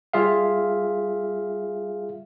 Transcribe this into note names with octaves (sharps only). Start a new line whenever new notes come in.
G3 F4 G#4 E5 F5